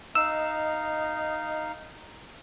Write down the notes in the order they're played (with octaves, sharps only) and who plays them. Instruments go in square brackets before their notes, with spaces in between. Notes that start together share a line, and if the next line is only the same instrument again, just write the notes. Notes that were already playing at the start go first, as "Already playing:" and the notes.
[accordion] D#4 F5 [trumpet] D#5 [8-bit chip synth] E6